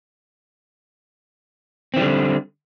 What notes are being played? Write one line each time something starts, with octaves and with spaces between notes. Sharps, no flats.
D3 E3 G3 C4